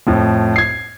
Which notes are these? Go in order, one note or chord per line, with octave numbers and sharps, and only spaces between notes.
F2 A2
G#6 C7